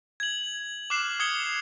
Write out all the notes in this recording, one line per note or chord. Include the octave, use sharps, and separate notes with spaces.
G#6 F#7
D6 F6 F#6 C7 E7
D6 D#6 G#6 C#7 G7